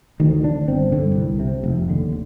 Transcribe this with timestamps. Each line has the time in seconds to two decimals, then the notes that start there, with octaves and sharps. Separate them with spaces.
0.20 D2 D#3
0.44 D3 D4
0.68 G1 C4
0.92 G2 D3
1.15 C2
1.39 C3
1.64 F1
1.88 D#2 D3